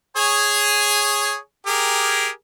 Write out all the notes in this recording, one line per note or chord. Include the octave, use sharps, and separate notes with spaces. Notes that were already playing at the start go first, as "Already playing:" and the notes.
G#4 C#5 G#5
G4 G#4 A#4